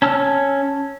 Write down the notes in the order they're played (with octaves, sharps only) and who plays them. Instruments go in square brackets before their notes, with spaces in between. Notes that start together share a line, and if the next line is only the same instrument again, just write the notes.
[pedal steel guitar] C#4 A5 E6 F6